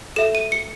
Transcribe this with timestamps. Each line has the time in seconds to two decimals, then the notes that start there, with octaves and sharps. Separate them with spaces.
0.16 A4 E5 E7
0.35 D#7
0.52 C#7